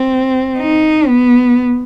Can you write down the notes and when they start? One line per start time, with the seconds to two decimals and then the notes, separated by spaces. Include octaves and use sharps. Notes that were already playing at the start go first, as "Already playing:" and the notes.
Already playing: C4
0.58 D#4
1.08 B3